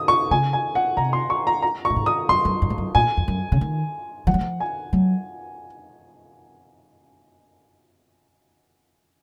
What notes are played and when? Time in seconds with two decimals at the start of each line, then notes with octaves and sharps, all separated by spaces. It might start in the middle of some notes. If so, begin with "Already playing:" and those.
Already playing: D#6
0.08 C#6
0.31 C#3 G#5
0.53 G#5
0.75 F#5
0.97 C3 A#5
1.13 C6
1.30 C#6
1.47 A#5
1.62 A#5
1.85 C#6
1.90 A#2
1.96 G#2
2.06 D#6
2.29 F#2 C6
2.45 F#2
2.62 F#2
2.70 G#2
2.78 F#2
2.95 A#2 G#5
3.17 F2
3.28 F#2
3.52 C#3
3.61 D#3
4.27 F3 F#5
4.34 F#3
4.41 F3
4.60 G#5
4.93 F#3